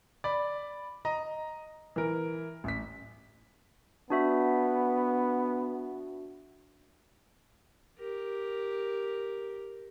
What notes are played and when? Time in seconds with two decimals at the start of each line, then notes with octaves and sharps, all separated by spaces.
0.24 D5 B5
1.05 D#5 A#5
1.96 E3 A#4
2.64 A1 B6
4.10 B3 D4 F#4 E5
7.98 G4 A#4